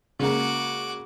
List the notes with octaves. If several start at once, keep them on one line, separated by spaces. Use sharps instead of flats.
C#3 G#3 A#3 F#4 D6